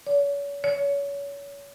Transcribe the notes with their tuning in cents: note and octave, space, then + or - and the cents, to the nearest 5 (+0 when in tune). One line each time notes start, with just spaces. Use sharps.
C#5 +40
C#5 +30